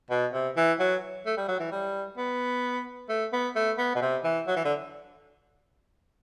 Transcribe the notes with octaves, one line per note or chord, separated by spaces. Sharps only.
B2
C3
E3
F#3
A3
G3
F#3
E3
G3
B3
A3
B3
A3
B3
B2
C3
E3
F#3
E3
D3